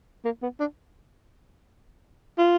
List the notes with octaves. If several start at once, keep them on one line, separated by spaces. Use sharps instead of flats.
A#3
B3
D4
F4